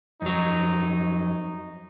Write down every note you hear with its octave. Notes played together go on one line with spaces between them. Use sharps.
F2 F#3 D#4